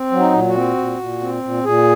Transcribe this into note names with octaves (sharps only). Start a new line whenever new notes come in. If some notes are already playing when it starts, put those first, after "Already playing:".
Already playing: C4
F#3
D#4
A#2
F#4
C4
A#2
A#2
C4
A#2
A#2 G#4